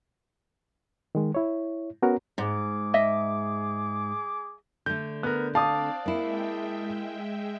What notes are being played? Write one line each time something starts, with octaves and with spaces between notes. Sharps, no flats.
D#3 G#3
E4 C#5
B3 C#4 F#4 A#4 C#5 A#5
G#2 G#4 D6
D#5 E5
D3 A3 G6
B3 A#4 F#6
C4 D5 F5 A5 D6 D#6
G#3 A#3 E4 E5 G5